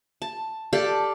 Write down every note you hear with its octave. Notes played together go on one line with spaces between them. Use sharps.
A5
G4 A4 D5 F5